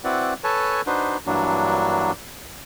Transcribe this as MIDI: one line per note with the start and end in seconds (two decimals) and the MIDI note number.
0.04 0.34 60
0.04 0.34 64
0.04 0.34 66
0.04 0.34 71
0.04 0.34 74
0.04 0.34 78
0.44 0.81 69
0.44 0.81 71
0.44 0.81 73
0.44 0.81 80
0.44 0.81 81
0.87 1.17 62
0.87 1.17 63
0.87 1.17 66
0.87 1.17 71
0.87 1.17 72
1.27 2.12 43
1.27 2.12 52
1.27 2.12 54
1.27 2.12 58
1.27 2.12 62
1.27 2.12 66